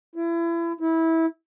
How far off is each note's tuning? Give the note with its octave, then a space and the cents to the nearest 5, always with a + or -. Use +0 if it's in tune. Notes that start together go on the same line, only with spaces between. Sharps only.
E4 +30
E4 -20